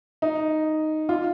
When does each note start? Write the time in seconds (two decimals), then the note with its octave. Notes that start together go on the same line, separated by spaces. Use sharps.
0.22 D#4
1.09 F4